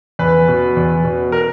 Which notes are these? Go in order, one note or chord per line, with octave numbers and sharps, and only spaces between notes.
E2 B4
B2
E2
B2
A#4